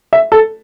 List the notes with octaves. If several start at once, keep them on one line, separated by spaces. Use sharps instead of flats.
E5
A4